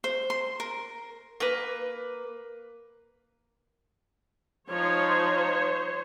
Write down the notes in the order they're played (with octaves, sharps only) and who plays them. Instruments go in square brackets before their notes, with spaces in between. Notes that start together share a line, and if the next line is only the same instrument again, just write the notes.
[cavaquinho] C5
C6
A#4
[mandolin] A#3 B4
[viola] F3 D#4 [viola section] C5 C#5